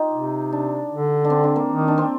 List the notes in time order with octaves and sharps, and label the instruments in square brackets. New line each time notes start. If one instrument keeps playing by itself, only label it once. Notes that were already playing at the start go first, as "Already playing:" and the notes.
Already playing: [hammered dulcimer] D#4 F4 G4
[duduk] C3
[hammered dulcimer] D4
[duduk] D3
[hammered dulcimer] D4
C4
D4
A#3
[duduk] D#3
[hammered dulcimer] D4
C4